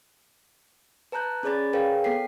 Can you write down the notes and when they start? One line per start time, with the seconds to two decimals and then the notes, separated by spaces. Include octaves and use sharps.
1.12 B4 A5 A#5 F#6 G6
1.43 C#4 G#4 C#5 D5 B5 A6
1.73 G#4 A#4 B4 C#5 F5 G5
2.04 B3 A4 G5 B6 C7